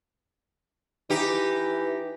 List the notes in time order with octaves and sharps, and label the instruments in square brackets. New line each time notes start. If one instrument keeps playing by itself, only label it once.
[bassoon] E3 [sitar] D#4 G4